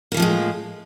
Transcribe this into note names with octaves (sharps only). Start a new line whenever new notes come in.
A2 E3 F3 G#3 A#3